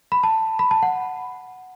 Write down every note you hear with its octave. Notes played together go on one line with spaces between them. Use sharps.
B5
A5
B5
A5
F#5